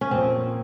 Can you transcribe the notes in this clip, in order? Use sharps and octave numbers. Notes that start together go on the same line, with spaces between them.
C#4
A#2 F3 A#3 C4